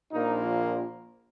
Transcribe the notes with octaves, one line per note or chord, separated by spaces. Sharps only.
A#1 A#2 F3 A#3 D#4